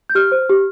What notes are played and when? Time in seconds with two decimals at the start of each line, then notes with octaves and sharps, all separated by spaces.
0.09 G6
0.15 G4 F6
0.32 C5
0.49 G4